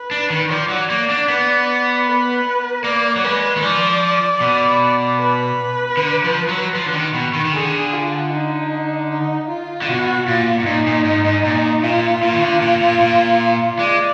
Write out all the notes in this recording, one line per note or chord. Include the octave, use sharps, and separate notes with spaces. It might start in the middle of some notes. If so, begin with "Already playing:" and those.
Already playing: B4
D4
D#3
F3 D5
F#3
A#3
D4
B3
B4
A#3 D5
F#3
G#3 B4
D#3
F3 D5
B2
B4
D3
F3
F#3
F3
D3
D#3
B2
D#3
D#3
D3 G#4
F4
D#4
D#4
F4
D3
B2 F#4
A#2 F4
G#2
A#2 D#4
A#2
G#2
G#2
A#2 D#4
A#2 F4
A#2
D#3
D3
A#2
A#2
A#2
G#3 D5